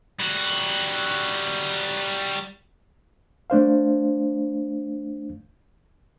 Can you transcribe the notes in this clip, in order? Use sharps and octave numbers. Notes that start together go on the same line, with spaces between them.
G3 F#4
A3 D4 C5 F5